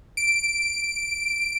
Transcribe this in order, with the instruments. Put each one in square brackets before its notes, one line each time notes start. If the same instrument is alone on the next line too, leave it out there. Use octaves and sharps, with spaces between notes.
[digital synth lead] D7